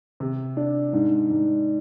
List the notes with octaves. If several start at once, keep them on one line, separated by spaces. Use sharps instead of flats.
C3
D4
G#2
G#2